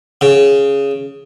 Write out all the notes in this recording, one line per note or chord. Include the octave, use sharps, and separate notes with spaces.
C#3